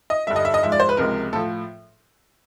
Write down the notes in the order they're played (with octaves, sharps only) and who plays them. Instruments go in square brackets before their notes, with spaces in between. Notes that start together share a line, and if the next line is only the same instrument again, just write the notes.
[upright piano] D#5
G2 D3 G3 E5
D#5
E5
D#5
G#2 F3 G#3 E5
D5
C5
B4
C#2 C3 F3 G#3 A#4
A2 F3 A4